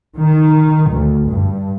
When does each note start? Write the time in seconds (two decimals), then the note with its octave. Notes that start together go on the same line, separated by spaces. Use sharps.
0.19 D#3
0.91 D2
1.29 G2